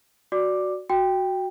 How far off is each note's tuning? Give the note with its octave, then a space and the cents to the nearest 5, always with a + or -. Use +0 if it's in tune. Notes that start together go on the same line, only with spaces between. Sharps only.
F#4 +0 D5 +0 D6 +5
F#4 +0 G5 +5